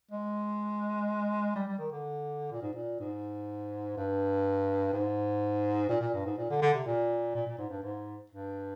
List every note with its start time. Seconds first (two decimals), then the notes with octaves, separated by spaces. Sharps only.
0.11 G#3
1.56 G3
1.68 G3
1.79 D#3
1.92 D3
2.52 A#2
2.62 G#2
2.74 A#2
3.00 G#2
3.97 G2
4.93 G#2
5.89 A#2
6.01 A#2
6.14 G2
6.26 G#2
6.38 A#2
6.50 D3
6.62 D3
6.74 C3
6.86 A#2
7.35 A#2
7.47 A#2
7.58 G#2
7.70 G2
7.83 G#2
8.31 G2